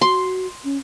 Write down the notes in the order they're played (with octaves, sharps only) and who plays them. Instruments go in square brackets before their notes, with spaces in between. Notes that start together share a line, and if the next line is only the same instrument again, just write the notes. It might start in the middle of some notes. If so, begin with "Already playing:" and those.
[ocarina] F#4 [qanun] C6
[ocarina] C#4